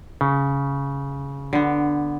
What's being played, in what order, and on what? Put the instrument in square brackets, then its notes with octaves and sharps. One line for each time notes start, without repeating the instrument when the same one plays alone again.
[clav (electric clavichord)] C#3
[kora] D3 B3